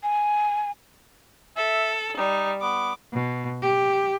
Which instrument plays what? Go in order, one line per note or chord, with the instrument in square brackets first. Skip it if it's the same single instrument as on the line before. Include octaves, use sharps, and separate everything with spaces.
[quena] G#5
[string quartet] A4 [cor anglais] E5
[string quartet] G3 [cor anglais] D#4
[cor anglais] B3 [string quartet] D6
[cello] B2
G4